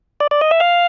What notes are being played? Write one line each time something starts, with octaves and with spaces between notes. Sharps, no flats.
D5
D5
D#5
E5
F5